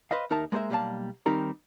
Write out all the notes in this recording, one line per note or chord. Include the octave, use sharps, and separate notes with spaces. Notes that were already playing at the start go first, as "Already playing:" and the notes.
B4 C5 D#5 F5
D#2 D#4 A#4 E5 A5
G#3 A#3 A4 C5 E5
B1 G3 A#3 B4 F5 A5
D#3 G3 C4 D#4 G4 A#4